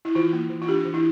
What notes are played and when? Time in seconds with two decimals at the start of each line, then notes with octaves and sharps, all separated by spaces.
0.05 E4
0.15 E3 F4
0.33 A#3
0.50 E3
0.62 F4
0.68 D4 G4
0.85 E3
0.94 E4